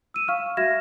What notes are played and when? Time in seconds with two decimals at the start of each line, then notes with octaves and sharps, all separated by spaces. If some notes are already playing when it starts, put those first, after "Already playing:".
0.14 E6 D#7 E7
0.28 F5 C#6 F6
0.57 F#4 E5 F6 G#6 A#6 E7